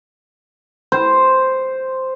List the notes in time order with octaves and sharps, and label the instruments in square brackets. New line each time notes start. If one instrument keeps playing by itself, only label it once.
[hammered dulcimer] C5